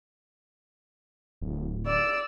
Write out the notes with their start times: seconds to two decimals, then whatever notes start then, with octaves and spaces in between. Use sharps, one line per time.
1.41 D1
1.86 D5 E6